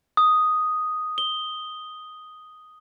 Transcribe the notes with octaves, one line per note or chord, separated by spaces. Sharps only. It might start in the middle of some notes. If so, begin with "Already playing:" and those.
D#6
G7